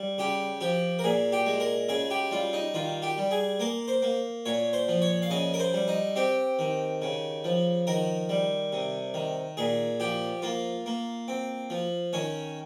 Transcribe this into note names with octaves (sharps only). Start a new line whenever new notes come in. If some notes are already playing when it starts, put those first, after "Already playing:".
Already playing: G3
C#3 G4
F3 G4
A#4
A#2 G#4
G4
G#3
A#4
C#3 G#4
G4
G3 F4
D#4
D#3 F4
G4
G3
G#4
A#3 A#4
C5
A#3
A#2 C#5
C5
F3
C#5
F5
C#3 D#5
A#4
C5
G3
D#4
C4 G4
D#3
C#3
F3
D#3 A#4
G3
C3
D#3
A#2 G#4
F3 G4
A#3 F4
A#3
C4
F3
D#3 C#4